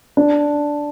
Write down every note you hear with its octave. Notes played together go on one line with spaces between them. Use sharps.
D4